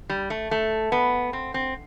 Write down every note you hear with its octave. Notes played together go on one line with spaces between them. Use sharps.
G3
A3
A3
B3
C4
C4